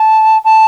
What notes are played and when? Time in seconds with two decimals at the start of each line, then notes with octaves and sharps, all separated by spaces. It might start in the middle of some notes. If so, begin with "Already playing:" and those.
Already playing: A5
0.44 A5